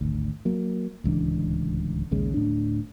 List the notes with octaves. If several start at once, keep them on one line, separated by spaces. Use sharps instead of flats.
G#1 D2
F#3 A#3
D1 C#2 E3 D4
A#1 D#2 C#3 G#3
D1 A2 D4